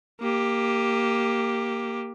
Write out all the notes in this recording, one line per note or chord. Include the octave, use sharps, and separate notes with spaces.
A#3 G4